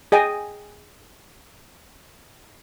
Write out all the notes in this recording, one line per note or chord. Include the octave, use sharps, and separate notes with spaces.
G#4 D#5 G5 G#5